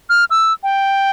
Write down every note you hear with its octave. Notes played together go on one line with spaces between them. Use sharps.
F6
E6
G5